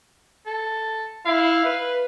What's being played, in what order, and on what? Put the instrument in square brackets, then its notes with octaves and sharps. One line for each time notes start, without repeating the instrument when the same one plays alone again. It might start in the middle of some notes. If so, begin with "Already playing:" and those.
[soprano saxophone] A4
[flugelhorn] E4 [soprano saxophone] F5
[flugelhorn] B4